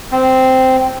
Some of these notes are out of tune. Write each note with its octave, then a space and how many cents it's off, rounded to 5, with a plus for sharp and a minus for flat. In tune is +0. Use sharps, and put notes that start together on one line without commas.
C4 -10